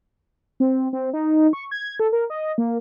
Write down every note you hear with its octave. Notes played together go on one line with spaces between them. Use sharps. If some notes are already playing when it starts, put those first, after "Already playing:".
C4
C4
D#4
C#6
G#6
A4
A#4
D#5
A#3